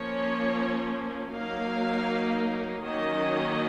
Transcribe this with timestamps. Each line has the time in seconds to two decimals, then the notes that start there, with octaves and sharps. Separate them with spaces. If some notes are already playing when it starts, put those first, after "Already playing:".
Already playing: F3 A#3 C#4 C#5
1.30 F#3 A#3 D#4 F5
2.82 D#3 F#3 A#3 C#4 D#5